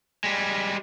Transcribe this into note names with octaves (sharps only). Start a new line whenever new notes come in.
G3 G#3